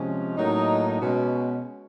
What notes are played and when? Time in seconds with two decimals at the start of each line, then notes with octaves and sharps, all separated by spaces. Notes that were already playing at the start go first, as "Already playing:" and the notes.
Already playing: C3 F3 G#3 C#4
0.37 A2 F#3 A#3 D#4
0.99 B2 G#3 C#4